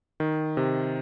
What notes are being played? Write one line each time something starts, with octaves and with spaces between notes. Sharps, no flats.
D#3
C3